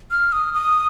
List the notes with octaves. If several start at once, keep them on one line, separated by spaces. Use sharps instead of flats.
F6
D#6
D#6